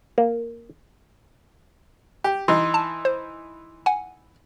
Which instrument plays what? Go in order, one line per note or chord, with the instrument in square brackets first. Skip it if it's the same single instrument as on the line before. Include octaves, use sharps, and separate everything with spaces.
[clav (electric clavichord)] A#3
[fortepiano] G4
[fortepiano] E3 D#4 [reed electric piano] C6
[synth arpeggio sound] A5
C5
F#5 G#5